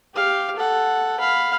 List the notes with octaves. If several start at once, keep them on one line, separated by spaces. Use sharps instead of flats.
G4 F5
A4 F#5
F5 B5